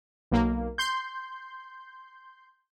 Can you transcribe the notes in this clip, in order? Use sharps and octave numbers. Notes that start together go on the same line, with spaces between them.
B1 A#3
C6 G6